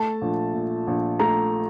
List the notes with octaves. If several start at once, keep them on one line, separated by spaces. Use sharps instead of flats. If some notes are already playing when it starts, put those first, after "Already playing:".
Already playing: A3 A5
A#1
A#2
A#1
A3 A#5